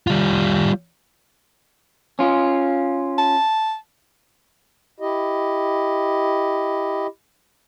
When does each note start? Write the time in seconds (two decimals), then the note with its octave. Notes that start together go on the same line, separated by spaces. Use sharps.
0.07 G3 F4
2.19 C#4 F4
3.18 A5
5.00 E4 G4 D#5